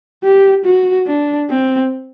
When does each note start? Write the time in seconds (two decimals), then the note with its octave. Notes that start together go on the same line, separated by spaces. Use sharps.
0.24 G4
0.65 F#4
1.07 D4
1.49 C4